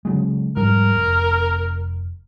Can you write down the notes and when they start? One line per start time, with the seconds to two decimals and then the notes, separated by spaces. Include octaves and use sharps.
0.05 C#3 F#3 G#3
0.56 G#2 F3 G3 A#4
0.95 F1